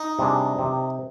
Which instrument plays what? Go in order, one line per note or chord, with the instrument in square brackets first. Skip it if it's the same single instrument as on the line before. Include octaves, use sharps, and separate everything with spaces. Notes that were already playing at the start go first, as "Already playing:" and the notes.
Already playing: [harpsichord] D#4
[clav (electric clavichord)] C3 G3 D4 G#4
C3